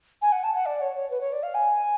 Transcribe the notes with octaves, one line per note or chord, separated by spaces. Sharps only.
G#5
F#5
A5
F#5
D5
C#5
C#5
B4
C#5
D5
F5
G#5